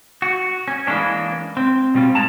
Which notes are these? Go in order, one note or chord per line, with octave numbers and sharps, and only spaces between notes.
F#4
C#4
E3 G#3 A#3 C#4 D4
C4
B2 G3 C4 C#4 F4
G#2 G#3 A5 A#5